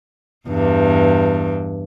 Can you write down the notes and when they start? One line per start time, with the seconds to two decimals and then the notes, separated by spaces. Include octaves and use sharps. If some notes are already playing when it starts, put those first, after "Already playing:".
0.47 E2 G2